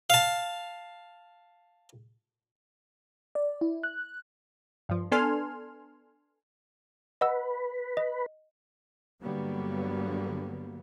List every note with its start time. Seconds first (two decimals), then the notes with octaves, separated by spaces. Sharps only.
0.10 F5 A5
3.35 D5
3.61 E4
3.83 F#6
4.89 G2 F3
5.12 B3 D4 A4 G#5 C6 F6
7.21 B4 D#5 F#5 E6
7.97 D#5
9.22 G2 D3 F#3 G3 A#3 B3